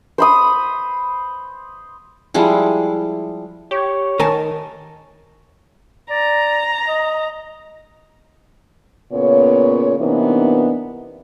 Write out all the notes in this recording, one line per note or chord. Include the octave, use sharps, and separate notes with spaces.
C5 B5 D#6
F3 G3 G#3 E4
G4 C#5
D#3 A#4 G#5 A5
D5 A#5
D#5
A#2 C#3 B3 C#5
C3 E3 A#3 B3 D4 D#4